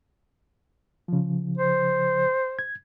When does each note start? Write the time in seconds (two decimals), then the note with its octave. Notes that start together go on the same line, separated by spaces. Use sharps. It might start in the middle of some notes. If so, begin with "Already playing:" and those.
1.08 C#3 F3
1.58 C5
2.59 G#6